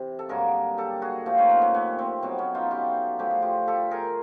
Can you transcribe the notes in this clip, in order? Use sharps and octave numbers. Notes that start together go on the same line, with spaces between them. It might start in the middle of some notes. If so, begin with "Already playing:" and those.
Already playing: C3 E3
A4
G2 D3 F#3 A#3 G#4 A#4
G4 A4
F#4 G#4
A#2 F3 A3 F4 G4
C#4 D#4
B3 C#4
B3 C#4
B3 C#4
C4
B2 F#3 B3 C4
B3 C#4
D#4 F4
F4 G4
D3 F3 A3 G4
G#4
F4 G4
G4 A4
G#4 A#4